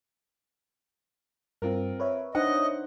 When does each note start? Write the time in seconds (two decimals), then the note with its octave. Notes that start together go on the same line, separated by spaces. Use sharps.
1.62 G2 C4 F4 A#4
2.00 B4 C#5 E5
2.35 D4 D#4 C5 D#5 F#5